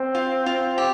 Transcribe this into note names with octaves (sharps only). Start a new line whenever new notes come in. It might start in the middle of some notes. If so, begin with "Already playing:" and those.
Already playing: C4
F4
F4
G4